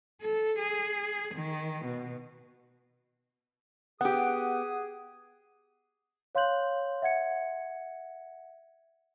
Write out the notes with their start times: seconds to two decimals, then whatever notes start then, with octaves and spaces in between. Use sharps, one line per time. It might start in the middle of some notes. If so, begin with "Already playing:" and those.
0.21 A4
0.59 G#4
1.35 D#3
1.85 B2
4.01 B3 G4 G#4 F#5 D#6
6.35 C#5 F5 C6 F#6 G6 F#7
7.02 E5 F#5 G#6 C#7